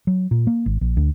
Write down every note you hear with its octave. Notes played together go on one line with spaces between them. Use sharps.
F#3
A#2
A#3
G#1
A#1
D2